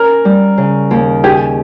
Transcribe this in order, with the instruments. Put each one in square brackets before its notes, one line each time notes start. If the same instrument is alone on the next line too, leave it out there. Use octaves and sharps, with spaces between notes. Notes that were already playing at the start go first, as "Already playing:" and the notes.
Already playing: [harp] C#4 [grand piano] A#4
[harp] G3
C#3
D#2
[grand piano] G4 [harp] G#4